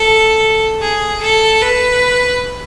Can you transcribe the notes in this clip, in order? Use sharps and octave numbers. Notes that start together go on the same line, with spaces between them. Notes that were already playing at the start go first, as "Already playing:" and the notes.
Already playing: A4
G#4
A4
B4